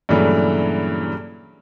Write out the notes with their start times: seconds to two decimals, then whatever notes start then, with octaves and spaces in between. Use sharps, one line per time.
0.09 G2 A#2 C#3 E3 F#3 A3